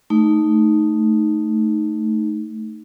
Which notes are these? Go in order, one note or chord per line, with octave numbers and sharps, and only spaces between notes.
A3 D#4